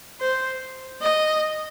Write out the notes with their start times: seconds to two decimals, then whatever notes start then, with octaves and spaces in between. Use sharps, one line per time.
0.21 C5
1.02 D#5